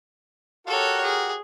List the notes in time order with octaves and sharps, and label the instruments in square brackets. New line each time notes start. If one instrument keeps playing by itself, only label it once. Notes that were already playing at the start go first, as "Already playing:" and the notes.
[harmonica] F#4 G4 A#4 [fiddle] A4 C#5
[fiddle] G#4